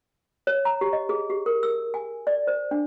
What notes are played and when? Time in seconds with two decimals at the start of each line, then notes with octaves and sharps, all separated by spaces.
0.47 C#5
0.65 A#5
0.81 G4
0.93 D#5
1.09 G#4
1.30 G4
1.46 A#4
1.63 E6
1.94 G#5
2.27 D5
2.47 C5
2.71 D4